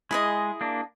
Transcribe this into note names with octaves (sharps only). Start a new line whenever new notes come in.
G#3 E4 G#4 D#5
A#3 D4